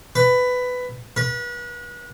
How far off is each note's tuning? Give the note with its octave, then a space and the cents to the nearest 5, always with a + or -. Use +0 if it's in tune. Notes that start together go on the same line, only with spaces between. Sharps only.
B4 +15
B4 -35